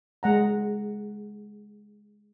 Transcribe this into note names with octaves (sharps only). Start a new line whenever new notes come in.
G#3 F#5 A#5